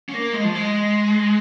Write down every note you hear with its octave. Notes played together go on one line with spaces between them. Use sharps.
C#4
A#3
G#3
F3
G#3